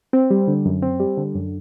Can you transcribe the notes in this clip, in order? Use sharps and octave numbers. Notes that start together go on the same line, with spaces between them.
C4
G3
D3
F#2
C4
G3
D3
F#2